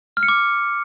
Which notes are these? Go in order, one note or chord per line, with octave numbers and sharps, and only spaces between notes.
F6
C#7
D6